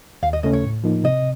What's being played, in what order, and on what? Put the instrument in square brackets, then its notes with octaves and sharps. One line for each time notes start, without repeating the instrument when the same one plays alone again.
[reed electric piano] D#2 [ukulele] F5
[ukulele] D#5
[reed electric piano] C#3 A3 C#4 [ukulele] D#5
[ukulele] C#5
[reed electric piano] A2
F3 A#3 D#4
[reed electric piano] C3 [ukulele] D#5